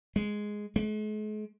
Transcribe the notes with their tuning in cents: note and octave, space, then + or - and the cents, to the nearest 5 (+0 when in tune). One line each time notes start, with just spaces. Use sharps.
G#3 +0
G#3 +45